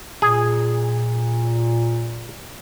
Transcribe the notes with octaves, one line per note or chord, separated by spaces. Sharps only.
A#2 G#4